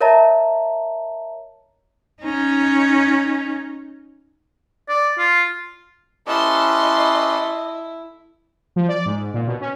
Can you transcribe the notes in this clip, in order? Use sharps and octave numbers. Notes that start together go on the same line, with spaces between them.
A#4 C#5 D#5 E5 A5 A#5
C#4 D#4
D5
F4
C#4 E4 G4 A4 B4 D#5 C6
F3
D5
G#2
A#2
B2
C#4